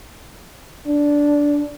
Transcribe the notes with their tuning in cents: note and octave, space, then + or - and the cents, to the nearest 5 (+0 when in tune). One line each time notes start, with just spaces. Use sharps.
D4 -10